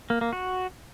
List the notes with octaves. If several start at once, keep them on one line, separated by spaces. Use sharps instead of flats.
A#3
A#3
F#4